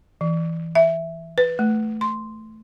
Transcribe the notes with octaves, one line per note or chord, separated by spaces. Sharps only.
E3
E5
B4
A3
C6